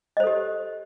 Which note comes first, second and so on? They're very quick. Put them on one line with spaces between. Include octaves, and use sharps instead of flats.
D#5 C5 A4 G4